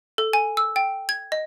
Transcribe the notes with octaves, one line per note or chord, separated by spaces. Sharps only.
A4
G#5
E6
G5
G#6
D#5